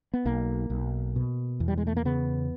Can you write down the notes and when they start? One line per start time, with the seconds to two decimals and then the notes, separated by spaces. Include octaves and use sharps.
0.13 B3
0.25 B1 A#3
0.70 B1
1.16 B2
1.60 E2
1.68 G3
1.78 G#3
1.87 A3
1.97 A#3
2.05 C#3 B3